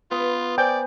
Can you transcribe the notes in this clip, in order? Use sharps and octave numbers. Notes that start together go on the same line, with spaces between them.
B3 F4
C5 D5 G5 G#5